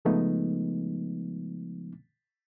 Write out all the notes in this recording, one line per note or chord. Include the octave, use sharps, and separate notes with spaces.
C#3 F3 G#3 A3 B3 D#4